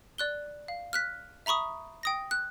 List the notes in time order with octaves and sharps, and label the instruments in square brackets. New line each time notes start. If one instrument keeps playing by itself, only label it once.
[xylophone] D5 F#6 G7
F5
F6 F#6 B6
E5 A#5 B5 C#6 D#6
G5 D#6 A#6
F#6